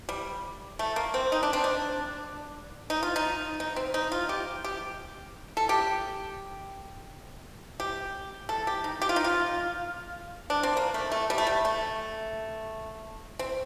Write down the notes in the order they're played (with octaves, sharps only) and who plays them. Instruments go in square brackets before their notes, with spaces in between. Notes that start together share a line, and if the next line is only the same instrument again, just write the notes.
[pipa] G3
A3
A#3
C4
D#4
D4
C4
D4
D#4
F4
D#4
D#4
C4
D#4
F4
G4
G4
A4
G4
G4
A4
G4
D#4
G4
F4
D#4
F4
D4
C4
A#3
A3
A3
G3
A3
G3
A3
C4